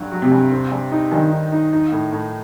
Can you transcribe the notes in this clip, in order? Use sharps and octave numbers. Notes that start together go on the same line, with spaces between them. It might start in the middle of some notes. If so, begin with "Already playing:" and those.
Already playing: G2 F#3
F#3
C3
G2
C4
G2
D#4
G2 D#3
D#4
D#4
D#4
A2
A2